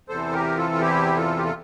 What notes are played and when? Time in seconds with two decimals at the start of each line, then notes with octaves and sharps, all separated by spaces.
0.09 E2 C3 E3 A4 C5
0.33 G4 A#4
0.57 F4 A4
0.71 F4
0.80 E4 G4
1.16 F4 A4
1.36 G4
1.45 A4